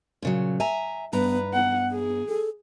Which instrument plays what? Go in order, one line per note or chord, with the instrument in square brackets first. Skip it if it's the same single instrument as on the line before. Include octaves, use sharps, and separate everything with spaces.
[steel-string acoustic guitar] A#2 C#3 F#3
E5 G#5 A#5
[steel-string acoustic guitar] G2 A#5 [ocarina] B3 [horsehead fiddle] B4
[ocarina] B3 [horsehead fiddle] F#5
[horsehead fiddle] G#4
[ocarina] A4